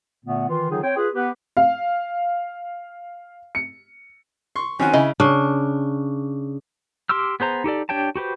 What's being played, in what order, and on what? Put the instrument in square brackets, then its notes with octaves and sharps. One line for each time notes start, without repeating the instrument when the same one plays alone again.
[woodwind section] A#2 D3 A3 B3
D#3 E3 F4
D3 D#3 F#3 D#4 F4 G#4
C4 C#5 G5
F4 G#4 B4
B3 G4 B4
[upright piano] F5
C#7
[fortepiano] C6 C#6
[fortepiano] D#3 C4 [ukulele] C#4 F#4 [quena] G#5
[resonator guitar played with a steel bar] C#3 [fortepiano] E4 [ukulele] D#5
[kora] C#3 D4
[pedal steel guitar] G4 C6 D6 E6 F6
B3 G#4 C5 A#5
D#4 G4 A4 D5
D4 G4 C#5 G5 A5
F#4 G4 B4 C5